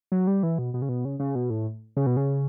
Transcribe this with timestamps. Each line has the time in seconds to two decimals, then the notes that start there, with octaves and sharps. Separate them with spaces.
0.12 F#3
0.27 G3
0.43 E3
0.59 B2
0.74 B2
0.82 C#3
0.89 B2
1.05 C#3
1.20 C#3
1.35 B2
1.50 A2
1.97 C#3
2.07 B2
2.17 C#3